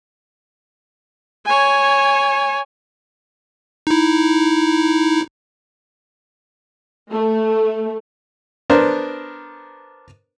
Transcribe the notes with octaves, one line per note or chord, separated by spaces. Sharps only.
C#5 G#5
D#4 E4
A3
B3 D4 A#4 C5